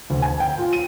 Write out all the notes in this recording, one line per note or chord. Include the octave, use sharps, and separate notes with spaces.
D2
G#5
G5
F4
D#7